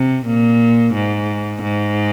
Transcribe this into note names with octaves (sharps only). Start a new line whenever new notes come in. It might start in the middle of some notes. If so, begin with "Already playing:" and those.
Already playing: C3
A#2
G#2
G#2